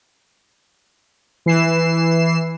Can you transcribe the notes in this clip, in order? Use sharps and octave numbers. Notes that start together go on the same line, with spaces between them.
E3 C7 E7